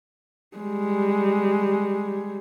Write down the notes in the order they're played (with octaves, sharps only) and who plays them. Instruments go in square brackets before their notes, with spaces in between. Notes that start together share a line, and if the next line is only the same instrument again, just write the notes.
[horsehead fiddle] G3 G#3